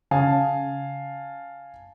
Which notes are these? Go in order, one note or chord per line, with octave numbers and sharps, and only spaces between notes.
C#3 F5 G#5 A5